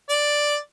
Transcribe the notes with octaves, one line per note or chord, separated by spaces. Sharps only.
D5